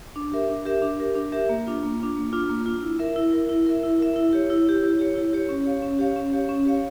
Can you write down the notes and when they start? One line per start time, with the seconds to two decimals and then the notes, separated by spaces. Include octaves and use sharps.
0.16 D4
0.32 G4 A#4 E5
0.50 D4
0.65 G4 A#4 E5
0.82 D4
0.99 G4 A#4 E5
1.15 D4
1.32 G4 A#4 E5
1.49 A#3
1.67 D4 F4
1.83 A#3
2.00 D4 F4
2.17 A#3
2.33 D4 F4
2.49 A#3
2.66 D4 F4
2.83 E4
2.99 A#4 E5
3.16 E4
3.33 A#4 E5
3.49 E4
3.67 A#4 E5
3.83 E4
3.99 A#4 E5
4.16 E4
4.33 G4 C#5
4.50 E4
4.67 G4 C#5
4.82 E4
4.99 G4 C#5
5.15 E4
5.33 G4 C#5
5.49 C#4
5.66 G4 C#5 F5
5.82 C#4
5.99 G4 C#5 F5
6.16 C#4
6.33 G4 C#5 F5
6.49 C#4
6.66 G4 C#5 F5